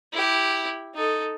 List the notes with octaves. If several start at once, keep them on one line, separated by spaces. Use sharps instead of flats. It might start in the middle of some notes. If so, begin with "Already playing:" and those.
E4 G4
D#4 A4